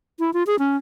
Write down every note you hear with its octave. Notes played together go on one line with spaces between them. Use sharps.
E4
F4
G#4
C#4